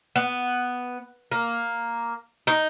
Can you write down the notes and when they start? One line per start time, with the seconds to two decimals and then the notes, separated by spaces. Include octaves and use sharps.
0.16 B3
1.32 A#3
2.47 D#4